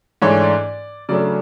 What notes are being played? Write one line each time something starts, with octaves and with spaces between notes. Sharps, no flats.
G#2 E3 A3 D4 C#5
D5
C#3 F#3 A3 D4 D5